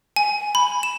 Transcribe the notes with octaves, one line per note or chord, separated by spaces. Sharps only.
G#5
B5
E7